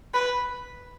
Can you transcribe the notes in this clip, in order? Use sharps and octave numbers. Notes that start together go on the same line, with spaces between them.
B4